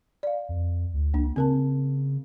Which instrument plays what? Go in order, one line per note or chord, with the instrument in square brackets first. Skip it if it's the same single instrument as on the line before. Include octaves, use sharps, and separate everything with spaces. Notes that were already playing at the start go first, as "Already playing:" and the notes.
[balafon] D5 F5
[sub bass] F2
D2
[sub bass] C#2 [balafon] A#3 D4
[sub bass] C#3 [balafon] C4 A#4 A5